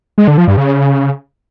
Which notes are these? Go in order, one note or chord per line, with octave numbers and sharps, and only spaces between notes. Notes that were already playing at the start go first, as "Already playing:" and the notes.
G#3
D3
F3
G2
C#3